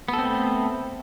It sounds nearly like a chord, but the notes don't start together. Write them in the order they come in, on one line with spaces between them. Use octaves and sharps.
B3 A4 C4 A3